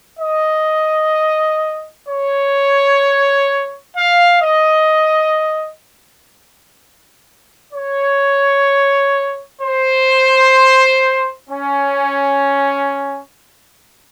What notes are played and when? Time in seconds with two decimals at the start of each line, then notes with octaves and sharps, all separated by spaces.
0.18 D#5
2.07 C#5
3.95 F5
4.42 D#5
7.72 C#5
9.60 C5
11.49 C#4